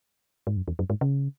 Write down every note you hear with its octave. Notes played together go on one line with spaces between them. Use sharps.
G#2
F#2
E2
F#2
G#2
C#3